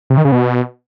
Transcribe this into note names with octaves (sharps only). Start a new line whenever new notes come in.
C3
D#3
C#3
B2